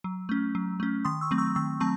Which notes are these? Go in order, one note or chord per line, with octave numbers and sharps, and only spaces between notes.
F#3
A3 C#4
F#3
A3 C#4
D#3 C6 D#6
C#6 E6
F#3 A3 C4
C#6 E6
D#3 C#6 E6
F#3 A3 C4 A5 C#6